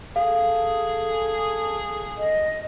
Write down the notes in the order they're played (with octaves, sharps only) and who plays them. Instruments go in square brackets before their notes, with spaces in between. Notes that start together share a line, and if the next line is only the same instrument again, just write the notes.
[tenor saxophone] G#4 [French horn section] A4 [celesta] F5
[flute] D#5